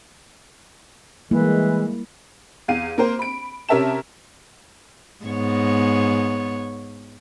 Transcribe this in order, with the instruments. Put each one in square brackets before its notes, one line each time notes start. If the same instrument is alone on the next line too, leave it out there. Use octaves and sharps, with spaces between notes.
[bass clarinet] E3 [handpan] G3 A#3 E4 [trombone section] G#3
[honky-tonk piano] E2 F5 D#7
A#3 A#4 C5
B5 D7
C3 C#4 A#4 E5 A5 E7
[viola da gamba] G#2 B3 C#5